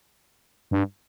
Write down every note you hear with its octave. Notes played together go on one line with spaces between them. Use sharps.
G2